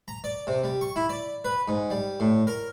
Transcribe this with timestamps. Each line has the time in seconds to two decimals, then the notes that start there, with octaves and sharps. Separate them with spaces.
0.08 A#5
0.24 D5
0.47 C3
0.64 G3
0.81 C#6
0.96 E4
1.09 D5
1.45 B4
1.68 G#2
1.90 G3
2.20 A2
2.47 A#4